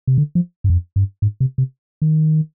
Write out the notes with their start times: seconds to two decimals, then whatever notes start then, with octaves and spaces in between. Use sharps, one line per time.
0.07 C3
0.18 D3
0.35 F3
0.64 G2
0.70 F2
0.96 G2
1.22 G#2
1.40 C3
1.58 C3
2.02 D#3